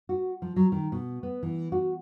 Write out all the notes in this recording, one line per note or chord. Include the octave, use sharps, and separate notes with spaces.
F#4
F3
F#3
D#3
B2
B3
E3
F#4